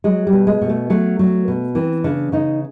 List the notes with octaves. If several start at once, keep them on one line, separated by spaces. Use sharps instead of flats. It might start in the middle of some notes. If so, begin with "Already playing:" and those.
F#3 G#3
G3
B2
G#3
B2
A3
F#3 A3
F#3
B2
E3 C4
C#3 D4
C#3 D#4